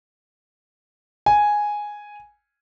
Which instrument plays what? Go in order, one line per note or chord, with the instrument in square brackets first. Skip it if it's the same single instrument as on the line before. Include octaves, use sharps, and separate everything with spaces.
[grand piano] G#5